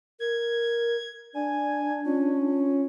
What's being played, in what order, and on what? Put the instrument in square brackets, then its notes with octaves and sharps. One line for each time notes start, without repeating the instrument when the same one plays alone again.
[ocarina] A#4 [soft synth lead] G#6
[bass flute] D4 [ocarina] D5 [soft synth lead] G#5
[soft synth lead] C#4 [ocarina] F4